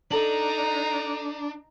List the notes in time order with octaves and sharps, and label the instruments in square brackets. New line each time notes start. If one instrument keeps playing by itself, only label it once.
[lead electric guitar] D4 [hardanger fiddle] D#4 A#5 [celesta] A4 F#7